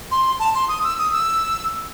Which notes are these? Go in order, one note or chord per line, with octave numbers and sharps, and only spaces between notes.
C6
A5
C6
D#6
E6
D#6
E6